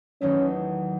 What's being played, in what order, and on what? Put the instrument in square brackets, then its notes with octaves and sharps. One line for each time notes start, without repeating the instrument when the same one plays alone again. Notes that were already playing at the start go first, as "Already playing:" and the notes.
[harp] E2 D#3 F#3 A3 D#4 [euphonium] C#4